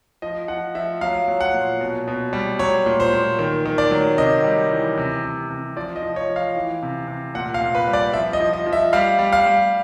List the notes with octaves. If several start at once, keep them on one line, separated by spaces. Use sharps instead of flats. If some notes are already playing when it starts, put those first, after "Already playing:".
F3 D#5
F3 F#5
F3 E5
F#3 F5
F#3
F#5
A#2
B2
B2
G3
F#3 C#5
A#2
C5
A#2
D#3
D#3
D5
F#3
C3 D#5
G3
E3
C3
C3
C3
F3 D5
D#5
F3
C#5
F3
F5
E3
C3
C3
A#2 F#5
F5
A#2
B4
G3
D5
F3 E5
D#5
F3
D#5
F3
E5
G3 F5
G3
F5
G3